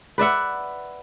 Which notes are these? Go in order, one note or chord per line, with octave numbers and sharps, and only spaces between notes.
B4 D5 E5 F#5